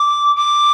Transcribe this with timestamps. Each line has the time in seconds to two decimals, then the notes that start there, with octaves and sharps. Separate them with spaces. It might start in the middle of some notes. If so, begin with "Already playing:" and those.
Already playing: D6
0.36 D6